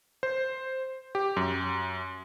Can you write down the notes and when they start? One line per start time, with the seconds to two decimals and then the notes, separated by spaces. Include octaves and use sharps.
0.23 C5
1.15 G4
1.37 F#2